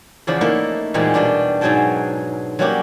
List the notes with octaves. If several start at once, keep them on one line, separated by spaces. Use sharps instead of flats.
E2 C#3 F3 D5 B5
A3 A#3 D#4 E4 A4
E2 A#2 G3 G#3 C4 D#4
B2 G3 D4 G4
G#2 B2 F#3 G#4 G5 A5
F#3 G3 A#3 C#4 F#4 G4